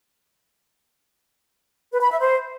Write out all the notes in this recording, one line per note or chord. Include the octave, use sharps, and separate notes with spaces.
B4
B5
E5
C5